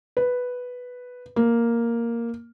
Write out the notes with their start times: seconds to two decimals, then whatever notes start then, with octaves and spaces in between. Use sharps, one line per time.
0.17 B4
1.36 A#3